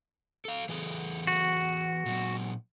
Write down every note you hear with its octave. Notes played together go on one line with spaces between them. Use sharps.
A4 F5
E3 G#4 A4
F#4
A#2 F#3